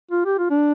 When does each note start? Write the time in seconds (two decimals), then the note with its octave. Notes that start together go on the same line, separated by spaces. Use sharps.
0.11 F4
0.25 G4
0.38 F4
0.50 D4